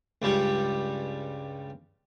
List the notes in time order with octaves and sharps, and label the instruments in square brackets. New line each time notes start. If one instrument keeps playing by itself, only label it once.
[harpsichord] C#2 G2 G3 G4 G5